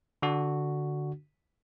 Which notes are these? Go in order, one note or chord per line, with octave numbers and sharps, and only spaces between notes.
D3 D4 F#4